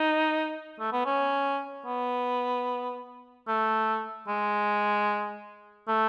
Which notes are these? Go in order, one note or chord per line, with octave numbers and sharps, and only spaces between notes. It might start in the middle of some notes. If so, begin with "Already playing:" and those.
Already playing: D#4
A3
B3
C#4
B3
A3
G#3
A3